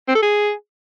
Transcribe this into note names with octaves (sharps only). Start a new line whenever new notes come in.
C4
A4
G#4